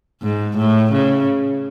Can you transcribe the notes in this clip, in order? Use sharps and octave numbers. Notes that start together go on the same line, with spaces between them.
G#2
A2
C#3